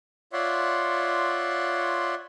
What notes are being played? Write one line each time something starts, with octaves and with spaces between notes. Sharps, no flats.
F4 C#5 D5 E5 F#5 C6